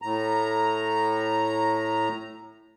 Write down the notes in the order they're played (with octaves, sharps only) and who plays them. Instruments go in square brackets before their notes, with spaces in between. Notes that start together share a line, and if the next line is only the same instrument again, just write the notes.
[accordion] A2 A#5